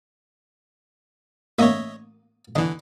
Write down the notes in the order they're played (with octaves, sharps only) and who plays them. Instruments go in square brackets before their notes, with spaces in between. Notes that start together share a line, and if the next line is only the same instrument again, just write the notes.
[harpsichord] A1 A#3 D#6 [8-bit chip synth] C#5 D#5 E5
[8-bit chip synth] D3 E3 [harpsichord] D4 D#5